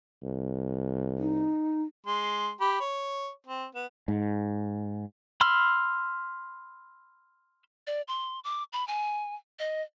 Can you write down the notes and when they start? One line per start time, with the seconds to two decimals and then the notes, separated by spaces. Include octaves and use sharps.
0.23 C2
1.18 D#4
2.06 G#3 C6
2.60 G4 B5
2.80 C#5
3.46 C4
3.75 B3
4.08 G#2
5.41 B5 C6 E6 F6
7.87 D5
8.08 C6
8.44 D6
8.73 B5
8.88 G#5
9.59 D#5